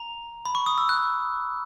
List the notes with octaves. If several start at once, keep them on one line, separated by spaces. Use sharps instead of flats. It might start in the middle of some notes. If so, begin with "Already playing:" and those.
Already playing: A#5
B5
C#6
D#6
E6
F#6